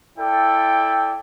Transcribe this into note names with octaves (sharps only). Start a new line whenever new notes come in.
E4 A4 D5 G5